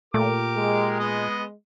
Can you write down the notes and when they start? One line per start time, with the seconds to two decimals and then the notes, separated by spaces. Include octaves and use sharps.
0.14 A#2 A3 G4 A#4 D6
0.56 G#3
1.00 B3 D#5